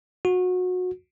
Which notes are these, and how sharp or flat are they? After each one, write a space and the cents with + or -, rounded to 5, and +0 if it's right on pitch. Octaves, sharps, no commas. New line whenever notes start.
F#4 -25